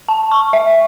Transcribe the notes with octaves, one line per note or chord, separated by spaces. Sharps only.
A5
C#6
E5